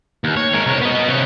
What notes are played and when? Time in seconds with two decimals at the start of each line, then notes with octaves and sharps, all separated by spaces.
0.24 D#2
0.37 C#5
0.54 G#3 A#4
0.66 C2 C#5
0.81 B3 D#5
1.09 C3 C#5